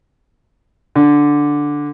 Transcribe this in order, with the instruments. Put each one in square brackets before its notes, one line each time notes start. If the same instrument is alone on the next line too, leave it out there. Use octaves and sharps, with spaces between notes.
[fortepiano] D3